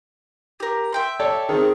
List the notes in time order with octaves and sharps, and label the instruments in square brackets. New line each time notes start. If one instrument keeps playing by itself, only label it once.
[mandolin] G4 A#4
E5 G5 C6
[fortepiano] A4 C#5 D5
[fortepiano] D#3 C4 [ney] G#4